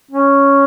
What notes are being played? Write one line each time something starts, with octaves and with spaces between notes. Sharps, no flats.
C#4